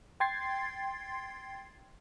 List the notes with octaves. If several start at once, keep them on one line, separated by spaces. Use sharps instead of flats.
G5 C6 G#6 A6 C7